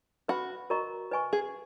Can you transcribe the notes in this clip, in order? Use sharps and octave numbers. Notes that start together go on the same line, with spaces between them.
F#4 B4 F#5 B5
F#4 A#4 D#5 A#5 C#6
B4 D#5 G#5 C#6
G#4